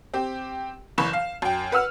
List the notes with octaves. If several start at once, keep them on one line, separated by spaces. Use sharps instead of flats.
C4 G4
F#1 E3 B5 C#6 E7
F5
F#2 G5
B4 F#5 E6 F6